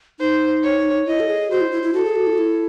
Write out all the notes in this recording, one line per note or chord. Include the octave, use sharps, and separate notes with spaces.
D#4 C5
C#5
E4 D#5
A4
G#4
F#4 C5
E4
E4
E4
F#4 A4
G#4
F#4
E4
F#4
E4